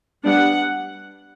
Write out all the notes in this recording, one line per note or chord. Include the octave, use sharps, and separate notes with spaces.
G3 B3 D4 F#5